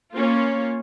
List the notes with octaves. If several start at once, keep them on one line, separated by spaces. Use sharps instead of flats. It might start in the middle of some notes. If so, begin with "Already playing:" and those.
A#3 C#4 F4